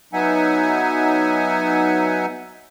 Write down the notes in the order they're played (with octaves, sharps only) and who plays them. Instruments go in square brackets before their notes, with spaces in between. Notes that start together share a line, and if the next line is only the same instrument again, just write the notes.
[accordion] F#3 B3 D#4 E5 F#5 G#5